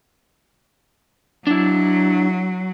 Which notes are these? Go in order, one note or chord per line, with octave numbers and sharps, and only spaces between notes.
F#3 D4 E4